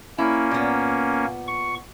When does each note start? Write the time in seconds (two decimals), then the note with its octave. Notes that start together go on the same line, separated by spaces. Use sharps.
0.18 A#3 C#4 E4
0.51 A#2 B3
1.48 C#6